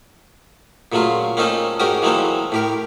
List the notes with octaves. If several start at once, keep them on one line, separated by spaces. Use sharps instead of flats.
A#2 C#3 F#3 A3 F4
A#3 C4 C#4 D#4 F4 A4
G#2 C#4 F#4 G4 A#4 D#6
E3 F#3 G#3 A#3 C4 A4
A2 G4 A#4